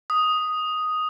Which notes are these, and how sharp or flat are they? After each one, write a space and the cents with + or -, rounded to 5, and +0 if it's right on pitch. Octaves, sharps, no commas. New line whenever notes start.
D#6 +0